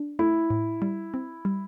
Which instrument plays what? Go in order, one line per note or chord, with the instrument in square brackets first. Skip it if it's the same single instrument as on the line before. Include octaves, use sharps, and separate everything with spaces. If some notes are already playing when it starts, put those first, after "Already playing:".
Already playing: [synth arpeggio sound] D4
[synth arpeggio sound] A3 [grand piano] E4
[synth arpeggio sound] A2
G3
C4
G3